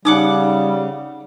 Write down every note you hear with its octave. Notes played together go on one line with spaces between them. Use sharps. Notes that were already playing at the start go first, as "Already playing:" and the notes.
C#3 G3 D#4 F#5 D6 D#6